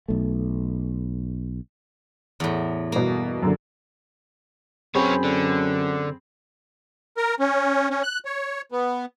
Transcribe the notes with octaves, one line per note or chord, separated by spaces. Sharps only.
B1 A3
E2 A2
G2 B2 A#3
F#2 D3
F#2 B3 C4 G#4 C#5 B5
D3
A#4
C#4
C#4
F#6
C#5
B3